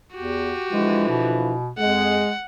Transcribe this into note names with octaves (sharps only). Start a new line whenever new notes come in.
E2 F#4 G4
D3 E3 F3 G#3
B2
F2 G#3 F#5